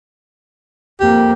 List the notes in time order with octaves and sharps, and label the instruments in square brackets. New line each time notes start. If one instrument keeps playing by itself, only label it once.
[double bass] F2 A#3 [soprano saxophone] G4